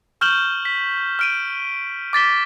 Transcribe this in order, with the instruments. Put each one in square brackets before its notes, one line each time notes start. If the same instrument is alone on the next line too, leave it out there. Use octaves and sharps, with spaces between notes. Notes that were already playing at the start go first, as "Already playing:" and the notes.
[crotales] C#6 F6 G6 E7 F#7 G7
B6
F6 D7 D#7
D6 A6 B6 G7